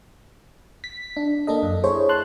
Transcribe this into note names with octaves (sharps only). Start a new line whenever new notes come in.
B6
D4
A#3 D4 A4 D#5
F#2
E4 G#4 C5 C#5
A5 C6 F#6